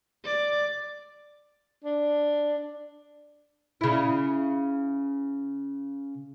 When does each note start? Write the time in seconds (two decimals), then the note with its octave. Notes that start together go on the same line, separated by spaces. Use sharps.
0.25 D5
1.84 D4
3.81 C#3 E4